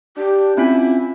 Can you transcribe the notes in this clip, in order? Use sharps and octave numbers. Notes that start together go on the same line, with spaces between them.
D4 G4
C4 C#4 E4 F4 G#5